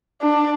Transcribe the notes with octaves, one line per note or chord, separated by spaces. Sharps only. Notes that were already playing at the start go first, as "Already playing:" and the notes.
D4